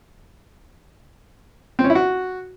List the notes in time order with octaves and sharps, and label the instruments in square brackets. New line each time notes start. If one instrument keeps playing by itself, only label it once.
[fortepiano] C4
C#4
E4
F#4